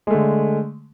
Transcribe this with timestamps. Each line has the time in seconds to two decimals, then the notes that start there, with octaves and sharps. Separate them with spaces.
0.07 G#3
0.11 A3
0.14 D3